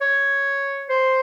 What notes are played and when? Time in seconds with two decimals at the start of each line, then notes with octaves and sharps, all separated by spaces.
0.01 C#5
0.90 C5